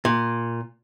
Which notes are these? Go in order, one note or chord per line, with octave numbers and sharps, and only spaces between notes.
A#2